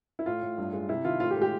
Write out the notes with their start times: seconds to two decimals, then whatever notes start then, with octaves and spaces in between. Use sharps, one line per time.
0.19 E4
0.26 A2 F4
0.42 A2
0.58 G2
0.73 G#3
0.89 C3 E4
1.05 D#3 F4
1.20 A2 F4
1.31 G4
1.36 G#3
1.41 G4